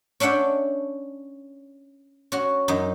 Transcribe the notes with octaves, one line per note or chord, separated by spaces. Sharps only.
C#4 D4 E5 F#5 G5
C#4 F#4
F#2 D#4